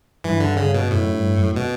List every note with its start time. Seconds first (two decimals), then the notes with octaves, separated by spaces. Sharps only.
0.24 G2 E3
0.40 D3
0.57 C#3
0.74 B2
0.90 F#2 A2
1.13 G2
1.34 F#2
1.56 B2